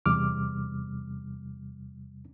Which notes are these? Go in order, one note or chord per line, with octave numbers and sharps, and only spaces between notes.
E2 C3 G3 D6 F6